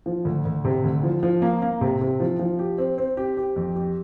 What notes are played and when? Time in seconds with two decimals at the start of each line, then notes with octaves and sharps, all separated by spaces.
0.06 F3
0.25 D2
0.45 D2
0.65 C3
0.84 D2
1.03 F3
1.23 F3
1.42 A#3
1.62 A#3
1.81 C3
2.01 C3
2.20 F3
2.39 F3
2.59 G4
2.78 C4
2.98 C4
3.17 G4
3.37 G4
3.56 F2
3.75 G4